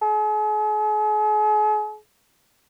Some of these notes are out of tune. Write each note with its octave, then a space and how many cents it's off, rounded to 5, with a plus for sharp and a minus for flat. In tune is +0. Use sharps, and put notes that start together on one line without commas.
G#4 +40